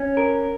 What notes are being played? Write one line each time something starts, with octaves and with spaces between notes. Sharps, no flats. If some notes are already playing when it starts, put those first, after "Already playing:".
Already playing: C#4
A#4